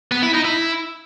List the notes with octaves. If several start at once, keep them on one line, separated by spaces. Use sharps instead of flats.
B3
E4
D#4
E4